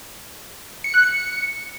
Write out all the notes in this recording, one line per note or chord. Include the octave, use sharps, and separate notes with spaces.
C#7
F#6
C#7